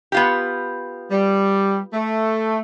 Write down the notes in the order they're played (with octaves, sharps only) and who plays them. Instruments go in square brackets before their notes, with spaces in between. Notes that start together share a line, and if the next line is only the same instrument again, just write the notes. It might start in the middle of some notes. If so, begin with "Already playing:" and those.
[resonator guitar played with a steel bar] B3 F4 G4
[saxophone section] G3
A3